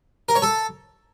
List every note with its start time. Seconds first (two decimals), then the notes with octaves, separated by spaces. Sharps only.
0.29 A#4
0.35 C#5
0.42 A4